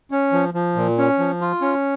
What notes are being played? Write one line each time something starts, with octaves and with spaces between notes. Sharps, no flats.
C#4
F3
F3
A#2
C#4
F3
F4
C#4